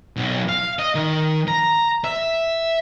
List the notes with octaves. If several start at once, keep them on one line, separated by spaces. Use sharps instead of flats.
B1
F5
D#5
D#3
A#5
E5